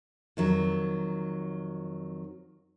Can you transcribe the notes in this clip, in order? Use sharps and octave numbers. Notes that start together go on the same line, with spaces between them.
F2 D#3 F#3